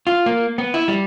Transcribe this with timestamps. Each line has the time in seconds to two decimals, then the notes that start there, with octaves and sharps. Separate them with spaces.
0.07 F4
0.26 A#3
0.58 B3
0.74 E4
0.88 G3